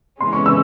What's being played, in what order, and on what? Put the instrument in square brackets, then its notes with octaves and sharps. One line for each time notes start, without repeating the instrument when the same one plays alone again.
[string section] E3 G#3 C#4 [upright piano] C6
[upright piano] C#6
E6